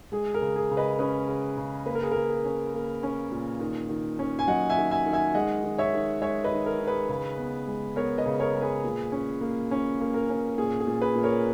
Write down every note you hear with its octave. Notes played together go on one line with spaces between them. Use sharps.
G#3 G#4
A#4
C#3
G#4
C#3
B4 D#5
C#4 G#4 B4
C#3
C#3
A#3 B4
A#4
G#4
A#3 A#4
G#4
C#4
A#3
C#4
A#2
D#3
D#3
C#4
G#5
F#3 D#5 F#5
E5 G#5
D#3
E5 G#5
D#3
E5 G#5
G#3 D#5 F#5
D#3
C#5 E5
D#3
G#3 C#5 E5
B4 D#5
D#3
A#4
D#3
G#4 B4
C#3
B3
G#3
B3 A#4 C#5
B4 D#5
C#3
A#4 C#5
G#3
G#4 B4
A#2
C#4
A#3
C#4
A#3
A#4
C#4
A#2 G#4
G#4
A#2
G#4 B4
A#2
A#4 C#5